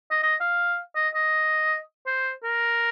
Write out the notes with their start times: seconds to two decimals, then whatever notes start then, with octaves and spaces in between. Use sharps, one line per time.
0.11 D#5
0.23 D#5
0.41 F5
0.96 D#5
1.15 D#5
2.07 C5
2.43 A#4